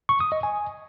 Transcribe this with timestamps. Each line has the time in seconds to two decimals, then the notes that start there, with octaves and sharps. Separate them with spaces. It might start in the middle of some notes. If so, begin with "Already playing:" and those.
0.09 C#6
0.20 D#6
0.32 D#5
0.43 G#5